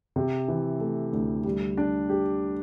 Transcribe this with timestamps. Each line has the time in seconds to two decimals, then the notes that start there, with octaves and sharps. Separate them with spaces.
0.16 C3
0.48 E3
0.80 A3
1.13 D2
1.45 G3
1.78 D4
2.09 G4